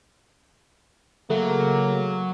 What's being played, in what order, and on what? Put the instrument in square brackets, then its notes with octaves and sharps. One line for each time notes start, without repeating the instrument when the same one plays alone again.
[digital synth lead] C#3 [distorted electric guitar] F#3 [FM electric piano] A3 [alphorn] A#3